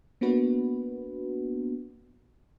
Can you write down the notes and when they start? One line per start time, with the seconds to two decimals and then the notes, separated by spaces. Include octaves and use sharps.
0.21 A#3 B3 D4 F#4 B4